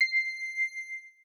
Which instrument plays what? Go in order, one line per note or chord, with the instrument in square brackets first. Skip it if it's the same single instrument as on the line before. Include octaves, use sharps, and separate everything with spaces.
[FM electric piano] C7